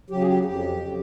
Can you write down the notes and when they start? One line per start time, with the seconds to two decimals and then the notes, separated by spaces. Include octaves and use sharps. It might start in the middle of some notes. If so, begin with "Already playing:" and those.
0.10 C#3 F#3 G4
0.21 G#4
0.27 G4
0.45 F2 G4
0.80 C#3 F#3